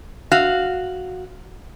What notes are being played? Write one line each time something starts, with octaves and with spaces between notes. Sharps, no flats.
F#4 F5